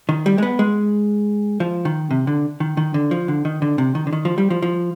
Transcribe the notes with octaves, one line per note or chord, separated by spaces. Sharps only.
D#3
G3
G#3
B3
G#3
F3
D#3
C3
D3
D#3
D#3
D3
F3
D3
D#3
D3
C3
D#3
D3
D#3
F3
G3
F3
F3